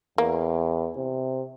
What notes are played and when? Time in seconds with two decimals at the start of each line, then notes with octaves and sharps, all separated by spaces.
0.18 E2 A#3
0.97 C3